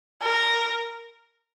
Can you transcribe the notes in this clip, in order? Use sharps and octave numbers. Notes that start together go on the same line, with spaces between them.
A#4